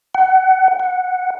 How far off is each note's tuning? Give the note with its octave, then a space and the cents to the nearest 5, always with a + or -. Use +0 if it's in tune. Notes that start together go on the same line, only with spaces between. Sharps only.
F#5 +25
F#5 -5